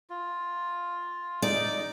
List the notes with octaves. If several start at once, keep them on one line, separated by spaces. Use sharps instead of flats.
F4
D#4 D5